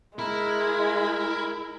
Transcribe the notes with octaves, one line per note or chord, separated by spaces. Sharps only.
G#3 E4 A#4 B5